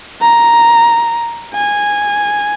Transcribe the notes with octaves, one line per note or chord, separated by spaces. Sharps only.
A#5
G#5